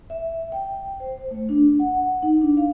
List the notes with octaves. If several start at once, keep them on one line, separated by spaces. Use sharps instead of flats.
E5
G5
C5
A3
D4
F#5
D#4
D4
F5